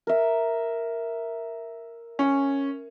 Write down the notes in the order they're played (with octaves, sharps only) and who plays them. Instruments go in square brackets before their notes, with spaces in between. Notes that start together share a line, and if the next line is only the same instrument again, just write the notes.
[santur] A#4 E5
[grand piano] C#4